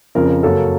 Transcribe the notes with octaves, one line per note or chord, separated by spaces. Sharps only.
F2 C#3 F3 A#4
A#4
F#2 C#3 F#3 A#3 A4